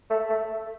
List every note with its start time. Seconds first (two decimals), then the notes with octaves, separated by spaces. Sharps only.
0.10 A3
0.29 A3